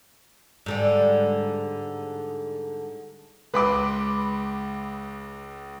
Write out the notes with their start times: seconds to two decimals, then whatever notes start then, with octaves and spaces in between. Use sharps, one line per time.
0.66 G#2 D3 G3
3.54 C#2 G#3 B4 B5 C6 D6